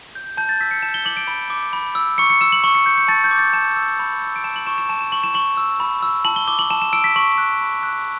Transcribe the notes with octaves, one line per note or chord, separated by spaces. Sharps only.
G6
A5 G6
A6
E6 B6
C#7
A5 E7
G7
D6 F#7
D7
B5
D6
B5
E6
C#6 C#7
C#7
E6 E7
F#7
C#6 F#7
C#7
G6 C#7
C#7
A5 A6
G6
D6
A6
A5 E7
E6
B5
E6
D7
A5 E7
F#7
C#6 E7
E7
A5 E7
E7
C#6 F#7
E7
C#6 F#7
E6
B5
E6
A5 F#7
G7
D6 G7
F#7
A5 E7
E7
E6 D7
B6
C#6 F#7
F#6
B5
F#6